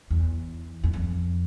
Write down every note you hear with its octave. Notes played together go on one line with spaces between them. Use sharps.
E2
E2
F2